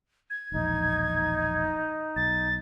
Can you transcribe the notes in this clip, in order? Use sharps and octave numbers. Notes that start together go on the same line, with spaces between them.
G#6
E1 A#1 D#4
B1 A6